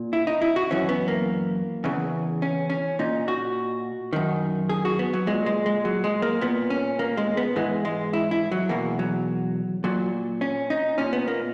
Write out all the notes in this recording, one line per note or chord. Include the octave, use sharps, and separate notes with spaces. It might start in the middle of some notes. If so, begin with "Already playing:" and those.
Already playing: A#2
E4
D#4
E4
F#4
F#2 E3 C#4
B3
A#3
E2 C#3 E3
C#4
C#4
A#2 D#4
F#4
F#2 D#3
G#4
F#4
B3
F#3
A#2 G#3
G#3
G#3
F#3
G#3
A#3
A#2 B3
C#4
A#3
G#3
B3
G#2 E3 G#3
G#3
E4
E4
F#3
E2 B2 A#3
F#3
A#2 F#3
C#4
D#4
A#2 C#4
B3
A#3